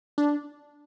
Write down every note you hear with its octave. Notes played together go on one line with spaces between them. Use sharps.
D4